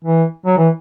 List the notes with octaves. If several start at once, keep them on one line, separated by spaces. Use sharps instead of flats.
E3
F#3
E3